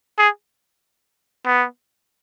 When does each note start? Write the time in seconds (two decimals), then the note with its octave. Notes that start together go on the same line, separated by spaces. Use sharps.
0.19 G#4
1.46 B3